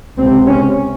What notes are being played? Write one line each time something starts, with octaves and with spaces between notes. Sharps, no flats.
C#2 C3 C4
C#4